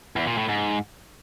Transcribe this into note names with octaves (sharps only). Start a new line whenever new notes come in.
E2
A#2
A2
G#2